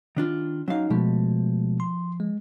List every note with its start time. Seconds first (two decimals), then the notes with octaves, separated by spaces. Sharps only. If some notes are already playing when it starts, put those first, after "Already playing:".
0.16 D#3 D4 F4
0.68 F#3 C#4 D#4 F5
0.90 B2 F3 G#3 A3
1.80 C6
2.20 G#3